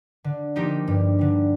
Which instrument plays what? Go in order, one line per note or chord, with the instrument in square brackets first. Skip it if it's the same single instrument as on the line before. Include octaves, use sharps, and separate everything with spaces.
[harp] D3
F3 A#3 D#4 G4
G2
D3 G3